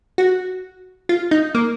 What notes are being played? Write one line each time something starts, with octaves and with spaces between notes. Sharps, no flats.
F#4
F4
D#4
A#3